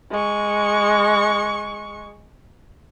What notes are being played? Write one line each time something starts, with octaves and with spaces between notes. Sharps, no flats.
G#3 C#6